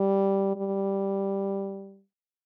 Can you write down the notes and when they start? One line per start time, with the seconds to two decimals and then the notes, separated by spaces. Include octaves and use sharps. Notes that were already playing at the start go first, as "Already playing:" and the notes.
Already playing: G3
0.56 G3